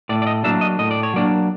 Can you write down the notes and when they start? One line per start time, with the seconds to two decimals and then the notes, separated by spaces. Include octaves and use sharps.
0.09 A2 D5
0.22 D5
0.27 D#5
0.44 F#3 A#3 D4 E5
0.61 D#5
0.79 A2 D#5
0.91 D5
1.03 C#5
1.14 F#3 A#3 D4 D5